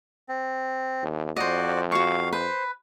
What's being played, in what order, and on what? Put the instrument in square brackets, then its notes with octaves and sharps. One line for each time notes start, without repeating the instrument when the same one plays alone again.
[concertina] C4
[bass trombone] D#2
[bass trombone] F2 [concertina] F#4 D5 [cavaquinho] C5 D#5
[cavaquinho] F#4 C#6 [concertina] F5
[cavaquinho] B4 [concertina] C5